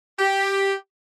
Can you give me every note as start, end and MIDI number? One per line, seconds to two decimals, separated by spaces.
0.18 0.74 67